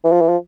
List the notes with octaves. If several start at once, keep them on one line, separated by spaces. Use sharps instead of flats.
E3
F3
E3
F3